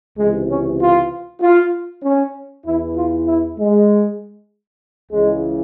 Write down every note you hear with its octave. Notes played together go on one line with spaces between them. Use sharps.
C#2 C3 E3 G#3
C#4
F4
F4
C#4
E2 E3 E4
F4
E4
G#3
C#2 C#3 E3 G#3